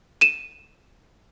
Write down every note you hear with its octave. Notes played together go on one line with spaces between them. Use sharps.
D#7 E7